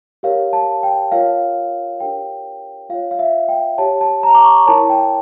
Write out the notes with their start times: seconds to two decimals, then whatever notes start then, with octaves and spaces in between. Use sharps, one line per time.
0.23 G4 A#4 C#5 F5
0.53 A5
0.83 G5
1.12 F4 A#4 C#5 F5
2.00 D4 G4 A#4 C#5 G5
2.90 F4 C#5 F5
3.11 F5
3.19 E5
3.49 G5
3.78 G4 C#5 A5
4.01 A5
4.23 A#5
4.35 D6
4.44 C#6
4.66 E4 A#4 C#5 A5
4.90 G5